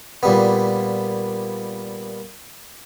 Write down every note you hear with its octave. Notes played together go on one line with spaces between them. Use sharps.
A#2 G3 B3